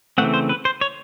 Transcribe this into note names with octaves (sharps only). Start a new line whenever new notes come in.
C#3 E3 A3 C4 F#5
C5
B4
C5
C#5